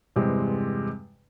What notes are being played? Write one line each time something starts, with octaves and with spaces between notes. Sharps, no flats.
E2 G2 C3 G#3 C4